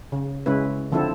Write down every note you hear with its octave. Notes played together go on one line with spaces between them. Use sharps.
C#3
C#3 G#3 C#4 E4 B4
D3 F3 C4 E4 A4